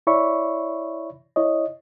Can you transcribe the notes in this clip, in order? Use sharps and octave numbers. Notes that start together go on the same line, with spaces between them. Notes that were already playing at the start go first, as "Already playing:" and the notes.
E4 C#5 D5 E5 B5 C#6
E4 C#5 D#5